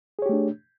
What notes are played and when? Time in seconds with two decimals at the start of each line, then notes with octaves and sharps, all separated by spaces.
0.19 G#4
0.22 C#5
0.26 G4
0.29 A3
0.33 D4